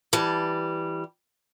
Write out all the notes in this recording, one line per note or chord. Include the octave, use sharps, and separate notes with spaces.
E3 G3 A5